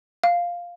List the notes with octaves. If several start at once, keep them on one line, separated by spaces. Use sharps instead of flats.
F5